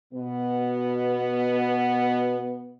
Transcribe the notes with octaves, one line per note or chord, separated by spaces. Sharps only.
B2 B3